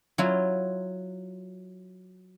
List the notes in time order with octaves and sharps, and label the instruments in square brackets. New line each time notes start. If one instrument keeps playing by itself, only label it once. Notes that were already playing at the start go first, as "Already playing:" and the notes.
[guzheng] F#3 E4 F4